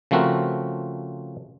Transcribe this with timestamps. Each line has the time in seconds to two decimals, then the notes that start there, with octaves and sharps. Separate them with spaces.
0.11 C#3 F3 A3 C4 F#4 A#4